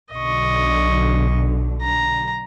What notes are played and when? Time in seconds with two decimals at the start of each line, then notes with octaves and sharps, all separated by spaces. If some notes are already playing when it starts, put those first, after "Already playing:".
0.14 B1 D3 D#5 C#6
1.82 A#5